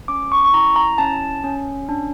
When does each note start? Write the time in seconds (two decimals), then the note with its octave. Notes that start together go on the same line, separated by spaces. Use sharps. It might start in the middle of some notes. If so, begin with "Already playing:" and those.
0.08 C#4 D6
0.32 C#6
0.45 C#6
0.53 E4 A#5
0.76 A#5
0.98 C#4 A5
1.44 C#4
1.89 D4